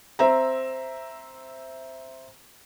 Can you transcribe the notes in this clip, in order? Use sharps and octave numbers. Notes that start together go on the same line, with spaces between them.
C4 E5 A#5